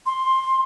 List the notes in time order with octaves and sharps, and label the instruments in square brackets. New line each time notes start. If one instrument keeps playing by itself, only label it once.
[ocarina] C6